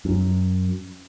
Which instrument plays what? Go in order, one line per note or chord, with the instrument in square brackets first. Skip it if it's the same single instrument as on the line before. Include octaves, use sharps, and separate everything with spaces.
[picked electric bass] F#2